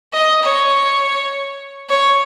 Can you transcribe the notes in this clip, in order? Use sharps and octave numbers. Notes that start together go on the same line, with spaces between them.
D#5
C#5
C#5